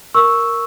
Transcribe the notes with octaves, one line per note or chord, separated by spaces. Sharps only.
A#4 C#6 E6